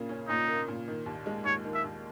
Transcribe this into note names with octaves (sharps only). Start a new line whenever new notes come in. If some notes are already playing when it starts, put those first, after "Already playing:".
Already playing: A#2 C#3 A#3
C#4
A#2 D#4
A#3
A#2
D#3
D#2
G#3
D#2 C#5
D#3
E5
D#2